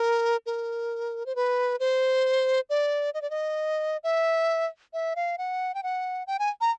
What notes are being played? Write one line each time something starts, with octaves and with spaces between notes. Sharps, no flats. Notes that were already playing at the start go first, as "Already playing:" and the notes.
Already playing: A#4
A#4
C5
B4
C5
D5
D#5
D5
D#5
E5
E5
F5
F#5
G5
F#5
G5
G#5
A#5